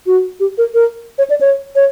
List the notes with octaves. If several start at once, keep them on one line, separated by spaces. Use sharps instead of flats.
F#4
G4
A#4
A#4
C#5
D5
C#5
C#5